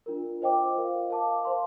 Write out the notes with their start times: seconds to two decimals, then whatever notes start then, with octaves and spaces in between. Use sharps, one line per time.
0.06 D4 F4 A#4
0.41 F4 C5 D#5 G5 D6
0.76 F4 A#4 F5
1.10 A#4 F5 A5 D6
1.45 C5 F5 C6